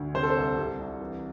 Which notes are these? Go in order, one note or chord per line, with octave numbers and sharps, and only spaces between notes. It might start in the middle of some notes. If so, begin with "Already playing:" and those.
Already playing: D2
C3 C5
A4
C5
C2
C3
C2
E3